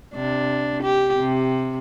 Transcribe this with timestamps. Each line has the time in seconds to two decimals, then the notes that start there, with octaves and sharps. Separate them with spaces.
0.15 C3 D4
0.83 G4
1.18 C3